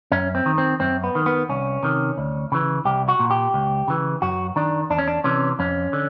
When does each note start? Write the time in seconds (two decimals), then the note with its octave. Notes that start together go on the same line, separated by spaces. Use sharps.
0.12 F#2 C#4
0.35 C4
0.46 D#3
0.58 C4
0.80 F#2 C4
1.04 B3
1.15 D#3
1.26 B3
1.49 C2 C#4
1.83 C3 D#3
2.18 D2
2.52 C#3 E3
2.85 C2 G4
3.09 F#4
3.20 A#2
3.31 G4
3.54 C#2
3.88 C#3 E3
4.22 F#2 F#4
4.56 D#3 D4
4.90 E2 D4
4.99 C#4
5.08 D4
5.24 C3 E3 C#4
5.59 F2 C#4
5.93 D3